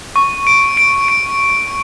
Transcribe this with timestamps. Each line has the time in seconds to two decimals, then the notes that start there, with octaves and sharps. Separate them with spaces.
0.16 C#6
0.47 D7
0.77 D7
1.08 D7